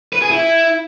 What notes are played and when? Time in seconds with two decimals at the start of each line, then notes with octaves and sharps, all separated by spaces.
0.13 B4
0.22 G#4
0.31 E4